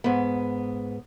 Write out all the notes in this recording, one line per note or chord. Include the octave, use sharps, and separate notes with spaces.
G#2 B3